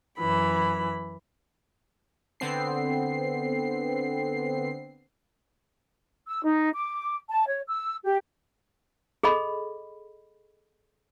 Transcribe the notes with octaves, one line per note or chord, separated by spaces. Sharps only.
F#2 E3 B5
D3 B3 C4 C7
E6
D#4
D6
A5
C#5
E6
G4
G#4 A4 D#5 B5